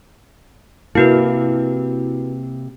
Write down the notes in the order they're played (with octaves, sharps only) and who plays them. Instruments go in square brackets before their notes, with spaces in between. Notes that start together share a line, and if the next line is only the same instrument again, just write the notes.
[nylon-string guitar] C3 A#3 [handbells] E4 F#4 B4